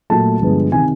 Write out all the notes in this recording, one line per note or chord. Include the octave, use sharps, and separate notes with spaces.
A#2 F#3 A3 A5
G2 D3 F3 G#3 B3
C3 D#3 G#5